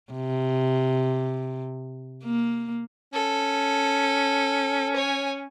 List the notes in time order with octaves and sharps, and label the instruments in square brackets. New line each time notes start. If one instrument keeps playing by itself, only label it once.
[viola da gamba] C3
A#3
[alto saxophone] C#4 [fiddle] A4
[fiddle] C#5 G#5